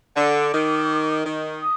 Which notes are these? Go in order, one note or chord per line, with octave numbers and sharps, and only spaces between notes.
D3 D6
D#3
D#3
D#6